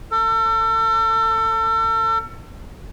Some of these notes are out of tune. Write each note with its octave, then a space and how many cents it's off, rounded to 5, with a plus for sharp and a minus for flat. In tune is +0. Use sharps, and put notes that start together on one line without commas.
A4 +35